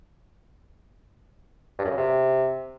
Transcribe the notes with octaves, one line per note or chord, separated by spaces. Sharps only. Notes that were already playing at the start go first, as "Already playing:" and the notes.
G2
F#2
C#3
C3